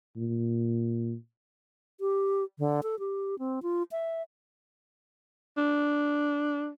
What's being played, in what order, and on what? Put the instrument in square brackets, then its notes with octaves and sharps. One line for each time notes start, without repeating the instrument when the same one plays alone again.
[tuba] A#2
[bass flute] G4
D3
A4
G4
C4
F4
E5
[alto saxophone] D4